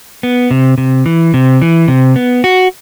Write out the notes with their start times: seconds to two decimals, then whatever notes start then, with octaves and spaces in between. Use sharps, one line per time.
0.23 B3
0.51 C3
0.78 C3
1.06 E3
1.34 C3
1.61 E3
1.88 C3
2.16 B3
2.44 F#4